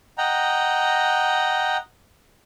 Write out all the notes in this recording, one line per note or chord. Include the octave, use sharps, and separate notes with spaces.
D#5 F#5 G5 A#5